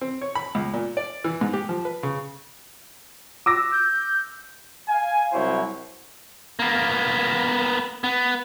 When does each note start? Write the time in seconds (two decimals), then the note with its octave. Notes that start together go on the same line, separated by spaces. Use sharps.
0.01 C4
0.22 C#5
0.35 B5
0.55 C#2
0.73 A#2
0.97 D5
1.24 E3
1.41 G#2
1.53 G4
1.69 F3
1.85 B4
2.03 C#3
3.46 D6 E6 A#6
3.72 G6
4.88 F5 G#5
5.33 C2 F#3 E4 C5 C#5
6.59 A#3 B3
8.04 B3